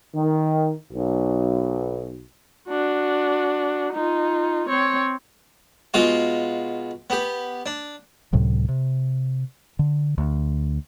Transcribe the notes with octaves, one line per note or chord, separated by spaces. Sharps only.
D#3
B1
D4 F#4
D#4 F4
C4 C#5
B2 G#3 F4 F#4 F5
B3 G4
D4
C#2 A2 C3 F#3
C3
D3
D2